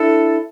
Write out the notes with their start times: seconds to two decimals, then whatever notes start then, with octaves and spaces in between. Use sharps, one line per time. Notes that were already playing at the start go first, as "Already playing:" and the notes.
Already playing: D4 E4 A4